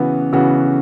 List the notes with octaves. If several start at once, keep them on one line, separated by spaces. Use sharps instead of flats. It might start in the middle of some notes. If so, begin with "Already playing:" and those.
Already playing: C#3 E3 B3 F#4
C#3 E3 B3 F#4